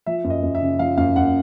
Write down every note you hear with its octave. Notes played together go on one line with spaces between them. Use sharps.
F3 E5
F#2
D#5
F#2
E5
C#3
F3 F5
F#2 F5
F#2 F#5